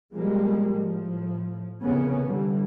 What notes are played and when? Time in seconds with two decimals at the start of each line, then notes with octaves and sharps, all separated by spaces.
0.14 B2 F3 G3 G#3 A#3
0.74 A2 F3
1.82 F1 E2 A#2 C#3 B3 C#4
2.26 D3 E3 G3